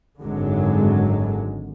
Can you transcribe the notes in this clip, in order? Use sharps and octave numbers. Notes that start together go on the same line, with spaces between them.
G#1 F#2 D3 F#3 G#3